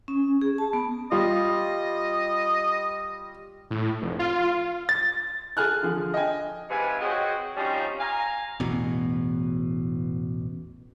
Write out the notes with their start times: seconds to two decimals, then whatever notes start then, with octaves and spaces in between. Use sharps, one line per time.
0.08 C#4
0.41 G#4
0.58 A5
0.73 B3
1.12 G3 F4 D#5
3.71 A2
4.02 F1
4.19 F4
4.89 A6
5.57 G#4 A4 G#5 F6 F#6
5.83 D3 F3 G#4
6.14 D#5 G5 G#5
6.70 G#2 C3 B4 F5 G#5
7.00 C4 F#4 G#4 C#5 D#5 G5
7.56 F3 G3 C4 C#4 D#4 F4
7.99 F5 G#5 A#5
8.60 A1 E2 B2